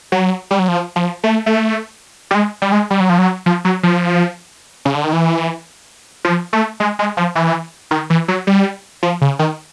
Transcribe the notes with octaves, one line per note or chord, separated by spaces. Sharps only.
F#3
G3
F#3
F3
F3
A3
A3
G3
G#3
G3
G#3
G3
F#3
F3
F#3
F3
F#3
F3
C#3
D3
D#3
E3
F3
A3
G#3
G#3
F3
E3
D#3
E3
F#3
G3
F3
C#3
D#3